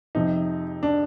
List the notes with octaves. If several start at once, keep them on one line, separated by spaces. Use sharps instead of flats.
F2 C3 F3 D#4
D4